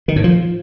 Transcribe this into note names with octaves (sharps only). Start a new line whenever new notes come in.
D#3
A2
F3